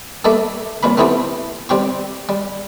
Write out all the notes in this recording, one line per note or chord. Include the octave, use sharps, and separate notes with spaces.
G3 A3 A#3 A4 D5 E5
C2 A#2 A#3 B5
A3 B3 C4 E4 G4 A4
G3 C4 G4 C#6
G3